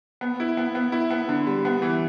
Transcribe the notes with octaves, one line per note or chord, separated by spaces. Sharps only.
B3
E4
B3
B3
E4
B3
D3
G3
B3
E3